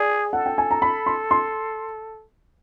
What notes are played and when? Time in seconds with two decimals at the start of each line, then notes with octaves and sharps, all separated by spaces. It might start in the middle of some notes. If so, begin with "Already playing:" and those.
Already playing: G#4 D5
0.33 A4 F#5
0.46 G5
0.58 G#5
0.71 A#5
0.82 B5
1.07 C6
1.31 C6